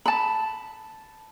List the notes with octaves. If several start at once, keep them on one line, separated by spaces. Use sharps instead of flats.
A5 B5